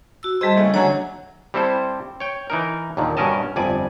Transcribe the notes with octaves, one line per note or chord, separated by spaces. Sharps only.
F#4 E6
G3 G#4 C5 D#5 A5
C#3 A3 E4
D3 F#3 C#5 F#5 G#5 A#5
G3 C4 E4 A4 C5
C#5 G5
E3 D#4 A#4
D#2 A#2 D3 D#3
G2 B2 C#4 A#4 D#5 A5
G1 F2 D5 G#5